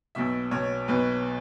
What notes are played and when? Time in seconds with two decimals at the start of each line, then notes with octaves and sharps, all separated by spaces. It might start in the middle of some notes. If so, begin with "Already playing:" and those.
0.15 B1 B2 E5
0.51 B1 B2 C#5
0.88 B1 B2 B4